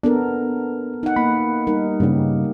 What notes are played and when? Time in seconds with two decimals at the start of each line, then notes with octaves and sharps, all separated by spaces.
0.03 B3 D4 A4 A#4
1.03 D#4 F#5
1.16 A#3 B5
1.67 G3 D#4 A#4
2.00 G2 C#3 G3 A#3 G4